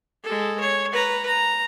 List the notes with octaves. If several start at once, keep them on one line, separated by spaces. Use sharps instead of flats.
G#3 A4
C#5
B4 A#5
A#5